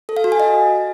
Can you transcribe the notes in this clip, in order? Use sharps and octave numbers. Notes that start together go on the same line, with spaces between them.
A4
F5
F#4
G#5
D#5